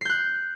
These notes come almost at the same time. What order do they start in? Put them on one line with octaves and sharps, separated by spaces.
C7 G6 F#6